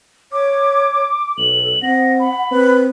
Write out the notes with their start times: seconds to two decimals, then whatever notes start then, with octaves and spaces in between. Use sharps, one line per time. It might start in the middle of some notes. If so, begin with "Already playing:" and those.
0.32 C#5 D6
1.38 B1 A4 F#7
1.83 C4 F#5 A#6
2.20 B5
2.51 C4 B4